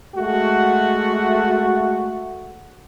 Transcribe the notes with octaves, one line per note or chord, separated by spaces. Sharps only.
G#3 A3 F#4